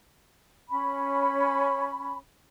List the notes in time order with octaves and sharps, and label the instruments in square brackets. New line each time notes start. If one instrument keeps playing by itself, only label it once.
[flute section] C#4 B5